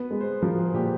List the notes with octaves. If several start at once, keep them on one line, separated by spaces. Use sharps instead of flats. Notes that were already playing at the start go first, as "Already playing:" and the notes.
Already playing: B3 B4
G#3
C5
F3 A#4
G#4
A#2 G4